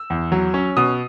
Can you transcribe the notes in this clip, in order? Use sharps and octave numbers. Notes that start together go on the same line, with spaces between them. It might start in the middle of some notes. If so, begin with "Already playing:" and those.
Already playing: E6
E2
F#3
C#4
B2 D#6